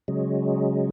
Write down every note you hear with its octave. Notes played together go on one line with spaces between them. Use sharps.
C#3 F#3 G#3